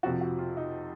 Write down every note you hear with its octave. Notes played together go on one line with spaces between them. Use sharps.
F2 C3 F3 F#4
F#4
F4
D#4